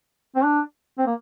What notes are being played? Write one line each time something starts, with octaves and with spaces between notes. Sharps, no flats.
C4
D4
C4
A#3